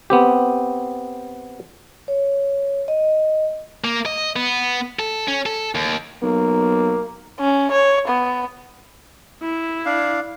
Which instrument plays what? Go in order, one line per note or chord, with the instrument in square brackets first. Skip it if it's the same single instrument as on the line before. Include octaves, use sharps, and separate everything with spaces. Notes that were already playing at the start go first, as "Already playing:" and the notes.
[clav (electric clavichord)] B3 C4 G4
[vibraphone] C#5
D#5
[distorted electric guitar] A#3
D#5
B3
A4
C#4
A4
D#2
[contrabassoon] B1 [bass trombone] A#3
[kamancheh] C#4
C#5
B3
[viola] E4
[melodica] D4 F5